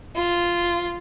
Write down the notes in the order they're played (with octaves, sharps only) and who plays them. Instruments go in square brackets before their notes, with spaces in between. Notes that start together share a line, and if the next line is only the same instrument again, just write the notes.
[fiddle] F4